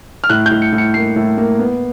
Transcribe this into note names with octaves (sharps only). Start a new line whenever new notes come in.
F6
A2 F#6
G6
A2
C#7
A2
C#7
A#3 C7
A2
A#3
B3